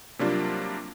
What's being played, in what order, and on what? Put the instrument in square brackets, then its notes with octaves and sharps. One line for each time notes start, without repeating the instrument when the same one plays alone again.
[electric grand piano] C3 F#3 G3 A#3 D4 F4